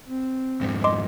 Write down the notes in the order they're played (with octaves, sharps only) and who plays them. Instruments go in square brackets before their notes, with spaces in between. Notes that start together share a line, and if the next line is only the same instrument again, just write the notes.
[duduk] C4
[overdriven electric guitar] F2 G#2
[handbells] D#5 C6 D6